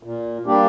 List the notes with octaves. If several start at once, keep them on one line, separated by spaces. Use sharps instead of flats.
A#2
G3 A#3 D4 G4